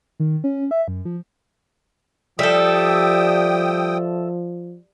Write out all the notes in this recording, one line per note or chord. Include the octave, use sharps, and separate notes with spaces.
D#3
C#4
E5
F#2
F3
F3 G3 A4 E5 G5 D#6